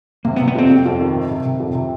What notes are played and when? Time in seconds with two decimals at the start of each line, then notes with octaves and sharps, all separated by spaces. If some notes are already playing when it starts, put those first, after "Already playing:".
0.25 C3 A#3
0.36 B3
0.41 C3
0.48 B3
0.55 F2 C4
0.70 F2
0.86 F2
1.00 D#3
1.15 C3
1.31 C3
1.46 C3
1.60 F2
1.75 C3